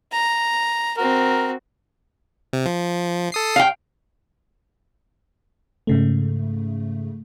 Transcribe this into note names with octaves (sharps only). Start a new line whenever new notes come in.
A#5
C4 F#4 A#4
C3
F3
A4 D#6 C7
F5 G5
G#2 C#3 A3